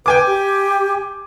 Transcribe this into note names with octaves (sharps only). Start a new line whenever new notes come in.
B4 G5 G#5 D6
G4